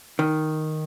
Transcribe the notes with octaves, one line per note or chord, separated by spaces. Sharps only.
D#3